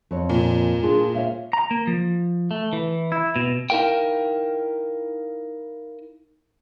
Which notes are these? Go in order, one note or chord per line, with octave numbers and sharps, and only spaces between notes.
F2 C#5
A#2
D4 F4 G#4
C#5 E5 F5
A#5
A#3
F3
A3
E3
E4
B2
D#4 E4 F#4 A#4 F5 G5